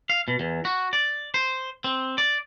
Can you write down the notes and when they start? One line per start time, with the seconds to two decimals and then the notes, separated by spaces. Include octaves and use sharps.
0.10 F5
0.28 B2
0.40 E2
0.65 F#4
0.93 D5
1.34 C5
1.84 C4
2.18 D5